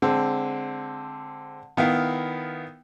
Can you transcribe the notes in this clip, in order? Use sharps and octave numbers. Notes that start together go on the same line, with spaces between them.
D3 G#3 C4
D#3 B3 E4 F5